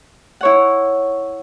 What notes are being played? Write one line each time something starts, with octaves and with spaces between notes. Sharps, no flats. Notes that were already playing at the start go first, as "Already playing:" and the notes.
E4 C#5 F#5